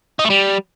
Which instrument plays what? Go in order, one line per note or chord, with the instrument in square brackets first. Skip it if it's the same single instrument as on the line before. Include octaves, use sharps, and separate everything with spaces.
[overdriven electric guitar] D#4
A3
G3